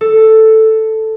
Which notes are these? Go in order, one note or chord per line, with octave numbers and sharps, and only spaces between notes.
A4